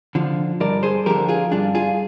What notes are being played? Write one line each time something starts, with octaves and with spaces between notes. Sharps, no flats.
D3 F3
G2 A#4 D5
G#4 C5
D3 F3 G4 A#4
F4 G#4
G2 D4 F4
F4 G#4